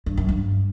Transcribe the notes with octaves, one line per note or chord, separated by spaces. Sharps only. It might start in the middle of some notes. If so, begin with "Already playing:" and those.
G2
F#2
G2